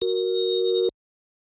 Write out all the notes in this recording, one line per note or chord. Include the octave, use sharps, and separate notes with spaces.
F#4 A#4